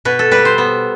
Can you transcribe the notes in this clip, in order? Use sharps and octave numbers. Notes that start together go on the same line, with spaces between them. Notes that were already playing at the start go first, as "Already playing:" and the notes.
B2 B4
A4
G3 B4
C5
B3